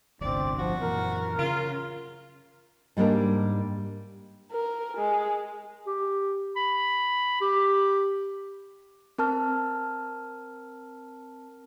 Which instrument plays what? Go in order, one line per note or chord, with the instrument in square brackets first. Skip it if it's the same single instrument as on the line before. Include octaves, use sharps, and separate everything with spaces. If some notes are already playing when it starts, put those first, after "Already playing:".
[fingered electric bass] D1 G1 C3 [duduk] C4 [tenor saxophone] D5
[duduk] F3 [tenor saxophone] F#4
[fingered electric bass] F#2 A#2 E3 [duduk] A#4
[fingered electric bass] C#3 C#4 [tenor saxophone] F4
[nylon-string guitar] G#2 G3 A#3 D4 A#4
[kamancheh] A#4
G#3
[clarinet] G4
B5
G4
[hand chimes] C4 A#4 A5 F6